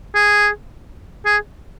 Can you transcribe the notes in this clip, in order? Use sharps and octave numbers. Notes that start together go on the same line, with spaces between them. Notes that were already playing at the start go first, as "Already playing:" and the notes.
G#4
G#4